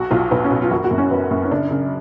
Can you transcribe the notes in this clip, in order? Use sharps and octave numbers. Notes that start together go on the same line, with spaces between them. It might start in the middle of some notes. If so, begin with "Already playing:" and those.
Already playing: B1 F#4
B1 F4
B1 B3
C#4
B2
F4
F#1 F#4
F#4
F#2
C#4
F#1 B3
F#2
C#4
C#3 D4
C#3